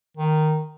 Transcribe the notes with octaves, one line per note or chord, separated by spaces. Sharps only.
D#3